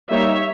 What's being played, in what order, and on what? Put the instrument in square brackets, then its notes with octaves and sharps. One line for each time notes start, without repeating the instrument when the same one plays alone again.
[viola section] G3 A#3 D#4 C#5 E5